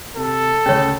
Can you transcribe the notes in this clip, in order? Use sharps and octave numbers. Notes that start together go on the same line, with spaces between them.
C3 A4
D2 C#3 C#4 C#5